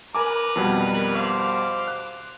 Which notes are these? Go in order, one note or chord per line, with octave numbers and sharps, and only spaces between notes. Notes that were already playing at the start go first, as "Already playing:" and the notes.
A#4 B4 G#5 A#5 D6
F2 B2 G3
A#4 B4
C5 F5 D6
F#6